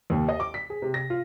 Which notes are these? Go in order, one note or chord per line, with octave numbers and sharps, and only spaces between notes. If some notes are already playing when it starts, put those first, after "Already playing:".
D#2
D#5
D6
B6
G#4
C3
A#6
F4